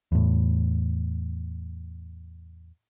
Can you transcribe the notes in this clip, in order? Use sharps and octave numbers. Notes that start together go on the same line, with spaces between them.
E2 A2